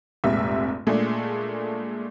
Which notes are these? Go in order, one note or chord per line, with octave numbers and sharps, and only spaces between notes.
F1 A#1 G#2 C3 E5
A#2 G#3 A3 D4 G#4